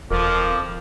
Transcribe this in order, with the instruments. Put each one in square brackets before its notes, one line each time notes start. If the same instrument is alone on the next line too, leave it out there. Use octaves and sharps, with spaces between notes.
[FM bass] D#1 [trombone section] F2 F3 [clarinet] A#4 [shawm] D6